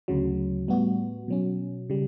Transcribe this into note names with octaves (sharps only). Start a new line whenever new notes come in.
D2 C#3 F#3
A2 G3 B3 F#4
B2 F#3 C#4
C#3 G3